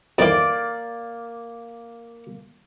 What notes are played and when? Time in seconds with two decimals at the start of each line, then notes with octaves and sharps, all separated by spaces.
0.18 F2 D#3 E3 A#3 D5